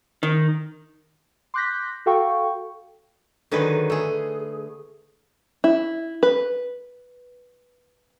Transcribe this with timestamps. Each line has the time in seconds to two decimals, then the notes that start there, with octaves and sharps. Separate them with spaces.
0.23 D#3
1.54 C6 D6 F#6 G6 A#6 B6
2.06 F#4 A4 F5 G5 C#6
3.51 D3 D#3 F#3 G#4 B4
3.90 A3 G#4
5.64 E4
6.23 B4